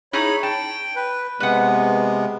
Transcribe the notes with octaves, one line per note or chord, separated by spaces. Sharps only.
D#4 E4 G#4 C#5 B5
G5 A5
B4
C3 G#3 B3 B4 F#5